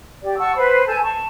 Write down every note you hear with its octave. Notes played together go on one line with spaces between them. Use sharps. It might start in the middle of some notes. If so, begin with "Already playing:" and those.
G4 D5
F#5 A5 C#6 E6
B4 C5 B5
A4 G#5 A5 G6
A5 C#6